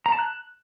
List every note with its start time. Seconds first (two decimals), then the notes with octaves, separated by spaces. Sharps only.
0.06 A#5
0.12 A5
0.19 F#6